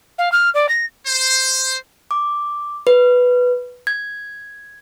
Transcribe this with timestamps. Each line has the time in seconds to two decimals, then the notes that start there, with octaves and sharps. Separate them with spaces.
0.18 F5
0.32 F6
0.54 D5
0.69 A#6
1.06 C5
2.11 D6
2.87 B4
3.87 G#6